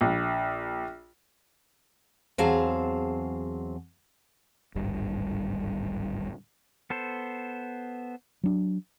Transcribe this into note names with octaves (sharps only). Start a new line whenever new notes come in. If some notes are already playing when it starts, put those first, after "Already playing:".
A#1
E2 F#3 C4 G#4 F5 A5
D1 G#1 G2 G3
B3 A4 C5
F#3 D4